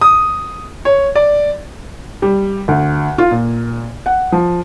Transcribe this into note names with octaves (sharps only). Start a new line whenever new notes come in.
D#6
C#5
D5
G3
D2
F4
A#2
F#5
F3